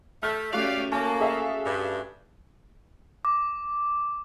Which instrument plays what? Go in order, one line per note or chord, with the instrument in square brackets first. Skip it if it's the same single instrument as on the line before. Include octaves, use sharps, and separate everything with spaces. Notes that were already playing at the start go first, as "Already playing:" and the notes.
[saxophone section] A3 [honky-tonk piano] F6 G6
[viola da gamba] A3 C#4 G4 [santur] F#4 [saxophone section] D5 F5
[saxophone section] A#3 [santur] C#4 D6 [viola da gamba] A4 [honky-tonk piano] A5
[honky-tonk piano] G#4 E5 F5
[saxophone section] G2
[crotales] D6